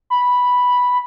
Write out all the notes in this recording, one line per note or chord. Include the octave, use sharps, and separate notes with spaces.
B5